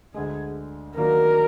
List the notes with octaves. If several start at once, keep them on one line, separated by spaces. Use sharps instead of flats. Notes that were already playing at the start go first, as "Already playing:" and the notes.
D2 D3 G#3 G#4
D#3 F#3 A#3 D4 F#4 A#4